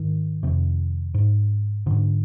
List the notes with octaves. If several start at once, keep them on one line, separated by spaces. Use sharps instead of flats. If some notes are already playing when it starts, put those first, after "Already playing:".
Already playing: G#2 D#3
F2 C3
G#2
G#2 D3